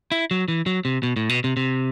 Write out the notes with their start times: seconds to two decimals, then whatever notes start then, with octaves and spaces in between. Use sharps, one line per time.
0.12 E4
0.31 F#3
0.48 E3
0.66 F#3
0.85 C3
1.03 B2
1.16 A2
1.29 B2
1.44 C3
1.57 C3